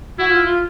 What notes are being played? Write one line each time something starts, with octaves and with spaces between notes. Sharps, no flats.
E4 F#4
F4
F4